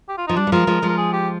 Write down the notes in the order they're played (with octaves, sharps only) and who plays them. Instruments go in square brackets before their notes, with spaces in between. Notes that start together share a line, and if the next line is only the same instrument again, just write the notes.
[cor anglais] G4
F4
[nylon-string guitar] F3 [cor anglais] D#4
[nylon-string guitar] G3 [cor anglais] D4
[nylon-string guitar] G3
[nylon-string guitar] F3 G#3 [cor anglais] A#4
[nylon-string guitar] F3 G#3
F3 G#3
[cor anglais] A#4
G#4
G4